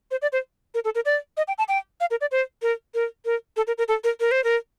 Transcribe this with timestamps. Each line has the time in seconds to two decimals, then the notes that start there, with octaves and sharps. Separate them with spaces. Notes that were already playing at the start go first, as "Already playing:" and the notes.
0.11 C5
0.22 D5
0.33 C5
0.74 A#4
0.84 A4
0.95 A#4
1.05 D5
1.37 D#5
1.48 G5
1.58 A5
1.68 G5
2.00 F5
2.11 A#4
2.21 D5
2.31 C5
2.62 A#4
2.94 A#4
3.25 A#4
3.56 A4
3.67 A#4
3.78 A#4
3.88 A4
4.04 A#4
4.20 A#4
4.31 C5
4.44 A#4